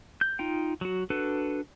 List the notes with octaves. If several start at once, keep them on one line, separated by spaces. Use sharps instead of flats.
G6
D#4 F4 G5
F#3 F#4
D4 F#4 A4 B4